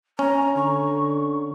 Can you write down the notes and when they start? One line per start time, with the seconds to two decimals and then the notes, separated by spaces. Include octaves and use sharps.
0.19 C#4 A#5
0.56 D3 C#6